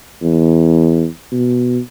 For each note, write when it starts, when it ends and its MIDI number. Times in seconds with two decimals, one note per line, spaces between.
0.23 1.06 40
1.32 1.79 47